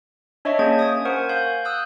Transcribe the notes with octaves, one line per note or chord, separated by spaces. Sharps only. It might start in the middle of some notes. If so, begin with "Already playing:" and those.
D4 C#5 D#5 E5 A5 C#6
A#3 C#4 G#4 G#5 G#6
D#6 G#6
A#4 C5 F#5 G#5 C#6
F5 G6
D#6 E6 F#6 G6